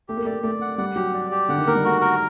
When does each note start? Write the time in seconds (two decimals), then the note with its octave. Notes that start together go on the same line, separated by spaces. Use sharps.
0.08 A3 G4
0.17 A#3
0.25 A3 D5
0.43 A3 D5
0.61 F#5
0.78 G3 F#5
0.96 F#3 G4
1.14 D5
1.31 G4
1.49 D3 F#5
1.58 D#3
1.67 A#3 A#4
1.75 G3
1.85 A3 F#4
2.01 A#4